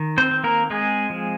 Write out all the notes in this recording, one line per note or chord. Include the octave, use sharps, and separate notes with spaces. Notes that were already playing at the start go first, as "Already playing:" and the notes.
Already playing: D#3
C4 C5
C4
A#3 A#4
G#3 C4 G#4
F3